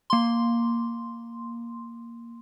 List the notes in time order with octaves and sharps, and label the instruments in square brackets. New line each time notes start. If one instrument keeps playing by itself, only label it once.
[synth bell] A#3 C6